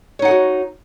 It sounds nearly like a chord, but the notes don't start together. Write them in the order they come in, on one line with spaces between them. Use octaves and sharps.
C#5 D#4 F#5 G#4 F#4